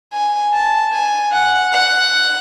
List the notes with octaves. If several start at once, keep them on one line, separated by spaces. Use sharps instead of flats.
G#5
A5
G#5
F#5
F#5